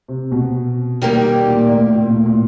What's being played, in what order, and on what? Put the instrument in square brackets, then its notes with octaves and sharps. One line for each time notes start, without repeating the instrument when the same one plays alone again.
[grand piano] C3
B2
[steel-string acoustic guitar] D#3 G3 A#3
[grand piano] A#2
A2
A#2
A2
A#2